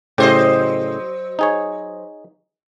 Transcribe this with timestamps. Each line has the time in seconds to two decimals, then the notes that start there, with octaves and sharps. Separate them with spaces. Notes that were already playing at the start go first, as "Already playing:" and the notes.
0.18 A2 C#3 F#3 G4 C5 D#5
1.39 D#4 G#4 C#5